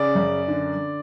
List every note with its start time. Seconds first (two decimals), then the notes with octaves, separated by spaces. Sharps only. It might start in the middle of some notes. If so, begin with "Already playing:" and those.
Already playing: C#3 D5
0.15 F#2
0.48 D3